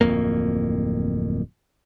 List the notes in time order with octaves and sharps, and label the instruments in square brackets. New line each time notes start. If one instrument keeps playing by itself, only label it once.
[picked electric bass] D1 F2 A#3